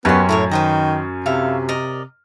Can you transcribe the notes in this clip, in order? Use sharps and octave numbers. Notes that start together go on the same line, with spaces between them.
F#2 B3 C#4 G4 C6
A2 E4 A#4 C#5
D#3 B4 C5 D#5
C3 E4 A4 F5
A#4 D5 D#5